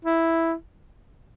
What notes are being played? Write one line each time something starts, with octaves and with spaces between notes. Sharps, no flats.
E4